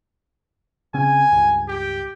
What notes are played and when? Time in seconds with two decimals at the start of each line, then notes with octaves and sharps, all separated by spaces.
0.94 C#3 C4 C#4 G#5
1.32 C#2 G2
1.68 G4